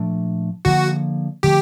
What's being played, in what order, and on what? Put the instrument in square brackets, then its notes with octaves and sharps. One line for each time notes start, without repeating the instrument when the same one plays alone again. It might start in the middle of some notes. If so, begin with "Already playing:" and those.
Already playing: [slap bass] A#2 F3 A3 D4
[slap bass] D3 F3 A#3 [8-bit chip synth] F#4
[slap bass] D3 F3 A3 [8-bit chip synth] G4